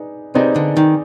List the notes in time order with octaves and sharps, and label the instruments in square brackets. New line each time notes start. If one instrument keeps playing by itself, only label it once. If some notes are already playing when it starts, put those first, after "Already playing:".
Already playing: [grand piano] D#4 G#4 B4 D5
[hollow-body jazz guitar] C3 [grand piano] C4 D#4 G#4 B4 D5
[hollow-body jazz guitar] D3
D#3